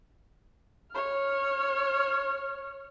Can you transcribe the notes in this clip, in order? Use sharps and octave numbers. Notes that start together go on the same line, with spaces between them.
C#5 F6